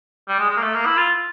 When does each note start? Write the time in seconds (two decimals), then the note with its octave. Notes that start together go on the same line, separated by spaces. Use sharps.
0.28 G3
0.39 G#3
0.50 G#3
0.57 A#3
0.62 A3
0.74 A#3
0.86 E4
0.97 F4